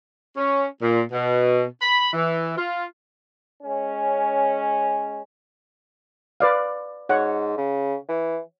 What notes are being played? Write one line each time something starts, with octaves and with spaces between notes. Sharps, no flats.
C#4
A#2
B2
B5
E3
F4
G#3 C#4
B4 D5 F5
G#2 C#5 F#5
C#3
E3